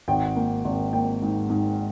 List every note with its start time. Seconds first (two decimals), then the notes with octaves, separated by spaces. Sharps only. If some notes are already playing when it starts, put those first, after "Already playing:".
0.08 G#1 G5
0.36 A#3
0.65 G#1
0.93 A#3 G5
1.22 G#2
1.50 G#2